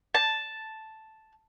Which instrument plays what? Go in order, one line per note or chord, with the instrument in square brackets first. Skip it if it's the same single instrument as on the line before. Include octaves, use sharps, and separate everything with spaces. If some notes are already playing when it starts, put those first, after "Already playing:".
[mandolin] A5